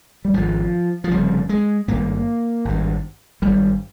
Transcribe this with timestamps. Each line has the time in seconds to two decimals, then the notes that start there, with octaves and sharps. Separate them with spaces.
0.25 G3
0.34 G#1 G#2 F3
1.04 F3
1.11 F1 F2 C#3 G3
1.49 G#3
1.88 G#1 G2 A#3
2.65 G#1 G2
3.42 G#1 G2 G3